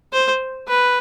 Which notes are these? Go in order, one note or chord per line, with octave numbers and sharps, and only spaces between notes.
C5
B4